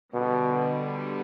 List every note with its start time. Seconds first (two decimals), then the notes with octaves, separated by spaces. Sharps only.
0.13 B2 D3 G3 B3